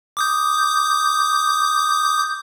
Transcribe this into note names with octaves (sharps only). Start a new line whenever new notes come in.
D6 D#6 G6